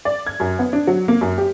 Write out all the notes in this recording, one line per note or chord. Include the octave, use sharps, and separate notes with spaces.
D5
G#6
F#2
B3
D4
F#3
A#3
F#2
G4